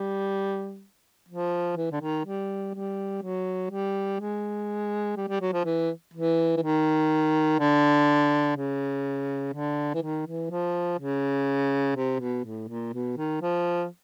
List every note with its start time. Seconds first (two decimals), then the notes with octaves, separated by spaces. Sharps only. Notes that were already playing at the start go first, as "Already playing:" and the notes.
Already playing: G3
1.29 F3
1.77 E3
1.92 D3
2.01 D#3
2.25 G3
2.74 G3
3.23 F#3
3.71 G3
4.20 G#3
5.17 G3
5.29 G3
5.41 F#3
5.53 F3
5.65 E3
6.14 E3
6.57 E3
6.62 D#3
7.59 D3
8.56 C#3
9.53 D3
9.94 E3
10.02 D#3
10.26 E3
10.50 F3
10.99 C#3
11.96 C3
12.20 B2
12.45 A2
12.68 A#2
12.93 B2
13.17 D#3
13.41 F3